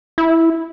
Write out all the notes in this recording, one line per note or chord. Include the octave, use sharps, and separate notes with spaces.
E4